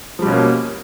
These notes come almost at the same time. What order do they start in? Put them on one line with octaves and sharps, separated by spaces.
F3 G3 B2 C#4 A#3